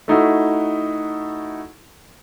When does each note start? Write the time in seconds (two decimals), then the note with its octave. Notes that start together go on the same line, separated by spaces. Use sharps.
0.08 A3 D#4 E4 F#4